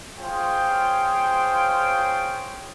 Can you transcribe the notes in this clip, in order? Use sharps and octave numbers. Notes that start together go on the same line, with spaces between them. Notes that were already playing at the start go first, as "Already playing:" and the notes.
F4 G#4 C5 C#5 F5 G5